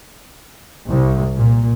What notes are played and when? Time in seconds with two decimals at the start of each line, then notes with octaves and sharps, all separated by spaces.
0.90 C2
1.35 A#2